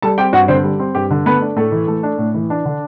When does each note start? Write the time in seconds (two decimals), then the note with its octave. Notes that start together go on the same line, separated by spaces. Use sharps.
0.02 G3 A4 A5
0.18 C4 G4 G5
0.33 G2 F#4 F#5
0.48 D3 C4 C5
0.64 G3
0.79 C4
0.95 G2 G4
1.10 D3
1.25 A3 B3 B4
1.41 D4
1.56 A2 A3 A4
1.72 E3
1.88 A3
2.03 D4
2.18 A2
2.34 E3
2.50 D4
2.65 D3